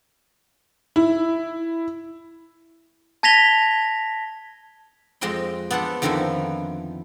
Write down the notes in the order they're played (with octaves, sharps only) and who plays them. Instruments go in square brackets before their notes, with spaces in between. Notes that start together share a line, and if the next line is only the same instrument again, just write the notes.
[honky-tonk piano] E4
[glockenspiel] A5 G#6 A#6 B6 F7 G7
[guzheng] F2 G#3 C4 D#5 G5 C6
B3 D4 A4 C5 F#5
F2 D3 D#3 F3 E4 G#5